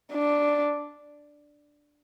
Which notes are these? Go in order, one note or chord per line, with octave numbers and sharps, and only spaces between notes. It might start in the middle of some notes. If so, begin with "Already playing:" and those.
D4